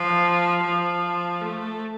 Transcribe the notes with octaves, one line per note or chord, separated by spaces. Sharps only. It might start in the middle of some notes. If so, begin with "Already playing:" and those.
Already playing: F3
F3
A3